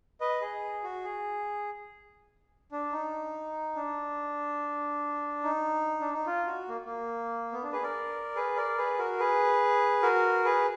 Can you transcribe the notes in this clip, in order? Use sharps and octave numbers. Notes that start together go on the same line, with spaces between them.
B4 D#5
G#4
F#4
G#4
D4
D#4
D4
D#4
D4
D#4
F4
F#4
A#3
A#3
B3
D4
G#4 B4
A#4 D5
G#4 B4
A#4 D5
G#4 B4
F#4 A#4
G#4 B4
F#4 A#4
G#4 B4